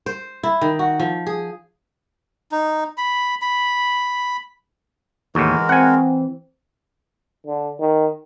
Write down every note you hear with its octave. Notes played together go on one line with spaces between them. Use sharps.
C5
E4
D#3
F#4
F3
G#4
D#4
B5
B5
D#2 A2 E3 G#3 F#4 A#4
C4 F#5 G#5
D3
D#3